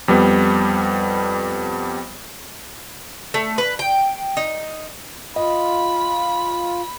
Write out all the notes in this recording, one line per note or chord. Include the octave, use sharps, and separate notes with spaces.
F2 G3 B3
A3
B4
G5
D#4
F4 D#5 B5